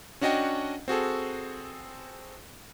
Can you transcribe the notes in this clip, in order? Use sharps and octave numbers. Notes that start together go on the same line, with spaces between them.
C#4 D4 F#4 D#5 F#5 G5
C4 F#4 G#4 A4